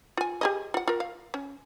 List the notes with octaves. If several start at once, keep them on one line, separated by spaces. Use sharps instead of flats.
F4 G#5
G4 G#4 D#5
F4 F#5
F4 A#4
F5
C#4